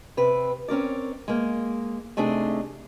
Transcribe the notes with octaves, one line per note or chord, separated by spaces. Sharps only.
C3 C4 B4
C4 C#4 A#4 D5
G#3 A#3
C3 A3 D4 D#4 G#4